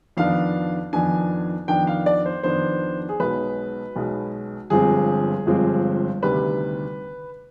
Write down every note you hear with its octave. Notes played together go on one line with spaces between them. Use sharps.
F2 D#3 B3 D4 F5
F2 D#3 B3 D4 G#5
F2 D#3 B3 D4 G5
F5
D5
C5
F2 D#3 B3 D4 C5
G#4
B1 B2 G#3 B4
B1 B2 G#3
G1 G2 F3 G#3 C4 G#4
G1 G2 F3 G#3 C4
D2 C3 D#3 G3 B4